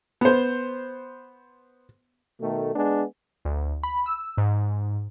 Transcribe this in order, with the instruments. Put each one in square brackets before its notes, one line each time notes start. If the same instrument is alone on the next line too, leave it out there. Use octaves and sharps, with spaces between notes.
[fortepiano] B3 C5
[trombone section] B2 D#3 A3
G#3 B3 D4 G#4
[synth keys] D2
B5
E6
G#2